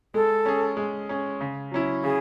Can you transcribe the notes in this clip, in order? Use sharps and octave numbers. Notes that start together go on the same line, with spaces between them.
G#3 A4
C#4 G#4
G#3
C#4 G#4
C#3
F#3 C#4 E4
C#3 G#4